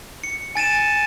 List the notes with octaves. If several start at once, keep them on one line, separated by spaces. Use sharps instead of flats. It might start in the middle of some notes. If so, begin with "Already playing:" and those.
C#7
G#5 A6 D#7 E7